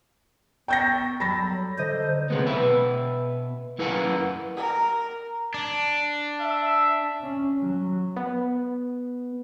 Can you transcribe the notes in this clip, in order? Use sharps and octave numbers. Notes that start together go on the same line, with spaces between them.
B3 G5 C#6 E6 G6 A6 A#6
F#3 G3 A4 A#5 B5 A#6
D3 A4 C5 D#5
C3 F#3 G#3 B3
B2 B4 E5
F#2 E4 A#4 B4 F#5 G#5
A#4
D4
E5
C#4
F#3
B3